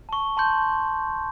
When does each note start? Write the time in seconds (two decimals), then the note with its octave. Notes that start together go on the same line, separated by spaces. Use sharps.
0.09 A5 C#6
0.37 A5 C6 G6